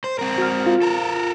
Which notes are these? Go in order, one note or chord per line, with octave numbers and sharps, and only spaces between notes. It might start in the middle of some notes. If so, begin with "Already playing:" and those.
C5
C4 A#4
F#4 F6
F4
A4 A#4